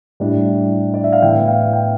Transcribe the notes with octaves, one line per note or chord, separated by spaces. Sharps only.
A2 G3 D4
D5
E5
F5
A2 E3 B3 G5
F5
G5